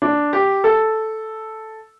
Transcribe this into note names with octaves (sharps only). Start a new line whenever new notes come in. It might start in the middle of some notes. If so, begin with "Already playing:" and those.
D4
G4
A4